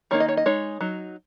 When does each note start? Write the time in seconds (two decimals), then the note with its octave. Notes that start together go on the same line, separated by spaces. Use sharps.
0.11 D#3 A#3 D#4 C#5
0.20 D#5
0.28 C#5
0.37 D#5
0.46 G#3 D#4 C#5
0.81 F#3 D#4